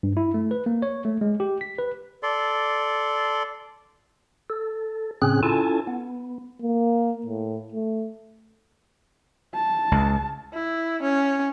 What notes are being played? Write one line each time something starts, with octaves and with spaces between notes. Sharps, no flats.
G2
E4
A3
B4
A#3
C#5
A3
G#3
G4
B6
B4
A4 D5 C6
A4
A2 C#3 C4 C#4 G#4 F#6
C#4 E4 F4 A4 G#5 A5
B3
A#3
A2
A3
A5
C#2
E4
C#4